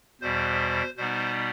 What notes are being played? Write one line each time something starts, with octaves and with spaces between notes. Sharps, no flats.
E2 B2 G3 C5
B2 G3 B3 D#4 C5